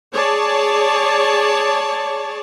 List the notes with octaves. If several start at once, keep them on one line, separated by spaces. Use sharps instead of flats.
G#4 C#5 D5 A5